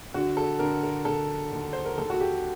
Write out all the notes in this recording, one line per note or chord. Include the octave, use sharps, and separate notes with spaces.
D3 F#4
A4
D3 A#4
A#4
D3 A4
D#2
C5
A#4
D#2 A4
F#4
G4